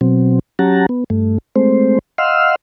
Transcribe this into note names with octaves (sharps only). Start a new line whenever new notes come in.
B2 F#3 C4
F#3 C#4 G4 F#5 A5 A#5
B3
G2 A3
G#3 A3 C4 C5
D#5 F5 F#5 C6 E6 F6